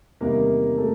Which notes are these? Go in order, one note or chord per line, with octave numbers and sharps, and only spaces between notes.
E2 C3 D#3 G3 A#3 A#4
A3 A4